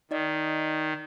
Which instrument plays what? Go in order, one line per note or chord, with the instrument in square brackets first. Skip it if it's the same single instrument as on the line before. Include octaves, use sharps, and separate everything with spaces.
[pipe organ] D#3 [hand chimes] D#4 D5 D#5